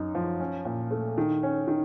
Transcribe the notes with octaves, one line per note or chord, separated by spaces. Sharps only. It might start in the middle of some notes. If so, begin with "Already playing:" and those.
Already playing: F#2 D#4
F3
C#4
A#2
A3
D#3
C#4
D#3